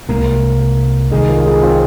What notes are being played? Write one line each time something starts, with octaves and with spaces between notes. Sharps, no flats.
C2 C3 G#3 A#3 C4
C2 C3 D#3 G#3 D#4 G#4
F4 A#4
D#4 G#4
C4 F4